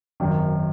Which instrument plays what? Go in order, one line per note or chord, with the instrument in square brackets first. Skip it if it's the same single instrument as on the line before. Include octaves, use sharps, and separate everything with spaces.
[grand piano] G#1 F#2 D#3